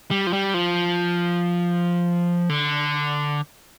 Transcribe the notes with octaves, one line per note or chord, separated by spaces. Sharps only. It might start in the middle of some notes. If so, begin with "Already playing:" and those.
G3
F3
G3
F3
D3